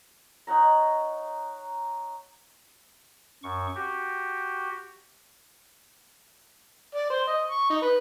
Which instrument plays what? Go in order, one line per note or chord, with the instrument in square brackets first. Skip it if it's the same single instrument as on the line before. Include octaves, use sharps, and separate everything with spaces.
[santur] D#4 C#5 F#5 A#5
[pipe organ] F#2 C#6
F#4 G4
[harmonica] D5
C5
D#5
C#6
D#4
B4